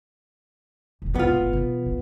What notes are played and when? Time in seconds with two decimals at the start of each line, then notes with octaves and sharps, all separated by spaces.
1.02 E1 A#1
1.15 E1 G#2 B3 F4
1.37 G1 A2
1.53 B2 E3
1.86 F#2 E3